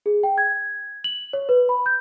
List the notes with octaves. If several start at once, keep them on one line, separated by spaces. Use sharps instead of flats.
G#4
G5
G#6
F#7
C#5
B4
B5
G6